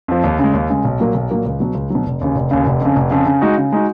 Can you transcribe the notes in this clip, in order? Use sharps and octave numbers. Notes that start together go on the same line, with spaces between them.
F2 F3
D#2
C#3 G#3
D#2
C#3 G#3
B1
A#2 F#3 A#3
B1
A#2 F#3 A#3
C#2
B2 F#3
C#2
B2 F#3
F1
D#2 C#3
F1
D#2 C#3
F1
F2 C#3
F1
F2 C#3
C#3
G#3 D#4 F#4
C#3
G#3 D#4 F#4